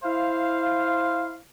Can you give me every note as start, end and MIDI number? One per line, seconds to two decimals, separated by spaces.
0.03 1.36 64
0.03 1.36 72
0.03 1.36 77